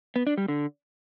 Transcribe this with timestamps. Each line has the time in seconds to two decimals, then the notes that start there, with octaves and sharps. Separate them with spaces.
0.16 B3
0.27 D4
0.38 G3
0.48 D3